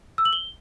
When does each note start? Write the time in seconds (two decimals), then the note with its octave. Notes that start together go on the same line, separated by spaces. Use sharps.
0.18 E6
0.25 F#7
0.33 G7